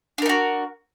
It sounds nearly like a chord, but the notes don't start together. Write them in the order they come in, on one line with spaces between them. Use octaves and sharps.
D4 A#4 D#4 F#4